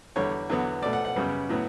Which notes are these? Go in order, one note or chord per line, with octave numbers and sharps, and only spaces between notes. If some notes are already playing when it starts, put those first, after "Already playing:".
E2 D3 G3 C#5
E2 D3 F#3 B3
B2 A3 D5
F#5
F#5
F#2 C#3 G3 B3
A2 F#3 B3